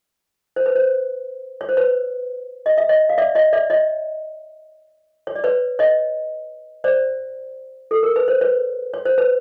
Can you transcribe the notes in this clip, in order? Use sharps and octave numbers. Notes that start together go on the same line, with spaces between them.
C5
B4
C5
C#5
C5
B4 C#5
D#5
E5
C#5 D#5
F5
D5 E5
C#5 D#5
D5 E5
C#5 D#5
C#5
D5
B4 C#5
C#5 D#5
C5 D5
A4
A#4
B4
C5
B4 C#5
C#5
C5
B4